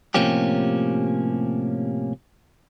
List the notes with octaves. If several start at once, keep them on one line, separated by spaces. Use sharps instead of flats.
A2 C3 F3 A#3 C#4 G4